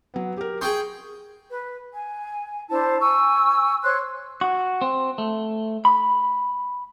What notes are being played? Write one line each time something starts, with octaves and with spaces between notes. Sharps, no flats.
F#3 B3
G4 A#4
G#4 G5 C6 C#6 D#6 G6
B4
G#5
D4 E4 C5 A5
G#5 C#6 E6
C5 C#5 C6 F#6
F#4
C4
A3
B5